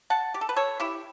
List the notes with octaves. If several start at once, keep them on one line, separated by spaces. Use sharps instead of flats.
F#5 A5
G4
A4
B4
A4 C#5
E4 G4